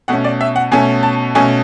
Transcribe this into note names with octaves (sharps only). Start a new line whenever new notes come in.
B2 A3 C#4 F#5
D5
E5
F#5
B2 A3 C#4 G#5
A5
B2 A3 C#4 G#5